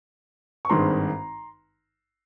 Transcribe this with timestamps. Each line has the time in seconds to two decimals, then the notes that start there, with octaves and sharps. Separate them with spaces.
0.65 C#6
0.69 G#1 G2 D#3 G#3 C4 A#5 C6